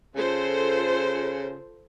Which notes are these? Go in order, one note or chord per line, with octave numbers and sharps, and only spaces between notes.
C#3 F4 A4 C5